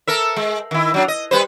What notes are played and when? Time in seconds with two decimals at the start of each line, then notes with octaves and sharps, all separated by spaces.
0.08 A4 A#4 E5
0.36 G#3
0.71 D#3 E4
0.94 F#3 D4
1.08 D#5
1.31 G3 B4 C5